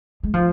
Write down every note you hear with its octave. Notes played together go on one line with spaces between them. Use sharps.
G#3
F3